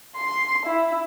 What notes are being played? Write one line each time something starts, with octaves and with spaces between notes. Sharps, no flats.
C6
E4